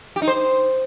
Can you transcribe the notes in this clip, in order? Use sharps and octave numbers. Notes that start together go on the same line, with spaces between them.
G4
D#4
C5